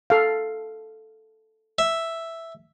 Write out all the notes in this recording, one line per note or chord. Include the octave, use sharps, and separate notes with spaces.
A4 F5
E5